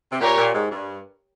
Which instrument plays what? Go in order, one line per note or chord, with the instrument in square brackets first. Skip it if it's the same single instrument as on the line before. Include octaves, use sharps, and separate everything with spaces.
[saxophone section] C3
[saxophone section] A#2 [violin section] G4 A#4 C#5
[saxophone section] A#2
G#2
G2